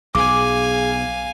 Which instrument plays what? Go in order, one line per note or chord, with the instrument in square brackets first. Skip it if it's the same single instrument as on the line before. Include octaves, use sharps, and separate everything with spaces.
[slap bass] B1 [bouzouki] G#4 [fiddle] F5 G#5 [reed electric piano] D6